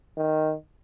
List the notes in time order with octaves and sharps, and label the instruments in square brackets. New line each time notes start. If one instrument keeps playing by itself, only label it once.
[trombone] D#3